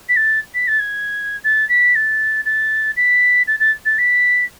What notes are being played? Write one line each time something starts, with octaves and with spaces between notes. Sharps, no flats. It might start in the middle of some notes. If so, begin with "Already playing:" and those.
B6
A6
B6
A6
G#6
A6
B6
A6
A6
B6
A6
A6
A6
B6